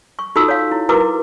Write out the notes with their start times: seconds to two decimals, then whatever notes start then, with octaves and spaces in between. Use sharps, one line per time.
0.19 C#6
0.36 D#4 F4 F#4 A4 E6
0.49 C#5 F5
0.71 E4
0.89 E4 F#4 A#4 B4 A#5 D6